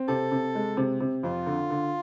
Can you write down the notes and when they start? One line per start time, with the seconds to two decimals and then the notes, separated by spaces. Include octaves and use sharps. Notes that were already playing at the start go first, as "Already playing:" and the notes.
Already playing: C4
0.08 C3 A4
0.32 C3
0.55 G#3
0.77 C3
1.00 C3
1.23 F2 F4
1.46 D3
1.70 D3